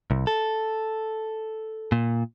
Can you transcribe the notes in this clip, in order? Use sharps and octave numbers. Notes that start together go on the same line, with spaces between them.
C2
A4
A#2